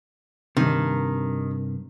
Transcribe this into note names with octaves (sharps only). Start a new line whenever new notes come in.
G2 C3 D#3